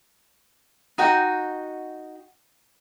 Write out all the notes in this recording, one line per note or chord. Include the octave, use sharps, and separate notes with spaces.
D#4 F#4 F#5 G5